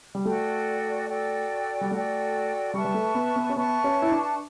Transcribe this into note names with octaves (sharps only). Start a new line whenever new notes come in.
G3
A3 F#4 A4 D5 G5
F#4 A4 D5 G5
G3
A3 F#4 A4 D5 G5
G3 B4 E5 A5 C#6
G3
A3
B3
B3
C#4
B3 B4 E5 A5 C#6
C#4
E4
D4